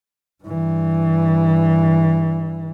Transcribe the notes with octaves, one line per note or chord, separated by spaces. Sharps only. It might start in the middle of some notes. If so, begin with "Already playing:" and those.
G2 E3